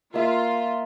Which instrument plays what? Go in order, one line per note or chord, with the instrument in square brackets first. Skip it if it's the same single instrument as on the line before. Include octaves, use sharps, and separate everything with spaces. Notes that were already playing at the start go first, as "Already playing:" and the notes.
[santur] A#3 E5 [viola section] F4